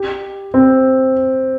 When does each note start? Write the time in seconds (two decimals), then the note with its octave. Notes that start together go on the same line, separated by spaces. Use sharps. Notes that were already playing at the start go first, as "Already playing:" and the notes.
Already playing: G4
0.54 C4